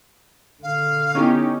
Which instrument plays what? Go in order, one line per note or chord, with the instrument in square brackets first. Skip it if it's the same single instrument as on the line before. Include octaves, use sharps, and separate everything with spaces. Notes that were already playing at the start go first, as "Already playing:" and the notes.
[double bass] D3 [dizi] F5
[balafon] B3 E4 C#6 [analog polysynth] C#4 D#4 G4